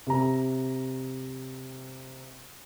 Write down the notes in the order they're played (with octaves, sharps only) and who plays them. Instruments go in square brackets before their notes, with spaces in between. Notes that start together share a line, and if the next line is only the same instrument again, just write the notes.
[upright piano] C3 A#5